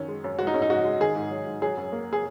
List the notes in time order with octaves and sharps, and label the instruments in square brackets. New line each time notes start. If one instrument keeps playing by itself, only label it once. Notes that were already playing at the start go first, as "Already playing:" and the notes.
Already playing: [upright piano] F#2 D#3 C#4
G#3
F#2
G#3 F#4
D#4
G#2 C#4
D#4
G#2 F#4
G#3
D#3 G#4
G#2
F#3
G#2
F#3 G#4
F#2
A#3
G#4